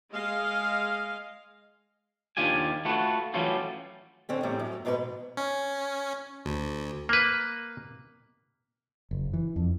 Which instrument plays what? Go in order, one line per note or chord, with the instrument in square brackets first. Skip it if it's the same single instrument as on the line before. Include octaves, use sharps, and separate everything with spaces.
[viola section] G#3 D#5 F5
[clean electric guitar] D#2 D4 F4 G4 G#5
A3 F4 F#4 B4
E3 F#3 G3 A3 C#4 F4
[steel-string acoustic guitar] D3 C4 C#4
E2 A2 G3
F#2
D#2 G#2 B2 A4 B4
[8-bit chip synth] C#4
D2
[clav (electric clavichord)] A#3 B4
[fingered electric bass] F#1
E3
F2